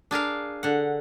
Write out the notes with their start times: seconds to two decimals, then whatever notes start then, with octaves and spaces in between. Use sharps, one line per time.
0.11 D4 G#4 A#4 F5
0.63 D3 F#5